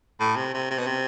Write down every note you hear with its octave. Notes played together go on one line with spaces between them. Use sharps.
A2
C3
C3
C3
B2
C3